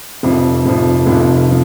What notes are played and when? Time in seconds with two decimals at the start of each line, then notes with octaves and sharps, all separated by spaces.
0.23 F1 F2 C3 F3
0.66 F1 F2 C3 F3
1.07 F1 F2 C3 F3
1.49 F3